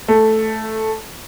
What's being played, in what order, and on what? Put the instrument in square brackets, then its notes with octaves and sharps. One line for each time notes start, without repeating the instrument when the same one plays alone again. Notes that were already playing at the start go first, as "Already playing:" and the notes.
[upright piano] A3